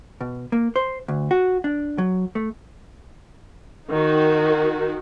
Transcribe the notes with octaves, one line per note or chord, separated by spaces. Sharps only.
B2
A#3
C5
D2
F#4
D4
F#3
A3
D#3 D#4 F#4